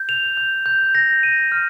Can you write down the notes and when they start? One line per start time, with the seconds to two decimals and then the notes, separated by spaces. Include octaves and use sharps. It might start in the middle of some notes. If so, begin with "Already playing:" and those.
Already playing: G6
0.09 F7
0.37 G6
0.66 G6
0.95 A#6
1.23 D#7
1.52 F6